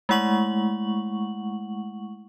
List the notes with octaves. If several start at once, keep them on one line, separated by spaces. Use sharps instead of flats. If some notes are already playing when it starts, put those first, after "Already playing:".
G#3 A3 E4 F#5 C#6 F#7